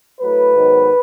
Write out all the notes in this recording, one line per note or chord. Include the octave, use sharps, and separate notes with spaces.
A2 F#3 A3 B4
G#2 D#3 F#3 B3